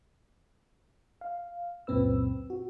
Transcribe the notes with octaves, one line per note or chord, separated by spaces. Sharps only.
F5
C#2 F#2 A#2 C4 B4 E6
F#4